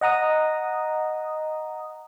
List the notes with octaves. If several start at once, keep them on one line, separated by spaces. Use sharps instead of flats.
D#5 F#5 A#5 D#6